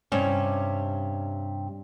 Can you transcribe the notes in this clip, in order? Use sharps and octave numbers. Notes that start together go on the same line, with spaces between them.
G2 C3 C#4